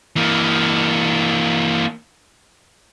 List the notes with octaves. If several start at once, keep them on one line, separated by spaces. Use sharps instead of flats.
E3 A#3